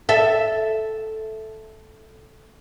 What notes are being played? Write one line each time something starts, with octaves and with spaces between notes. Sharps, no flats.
A4 E5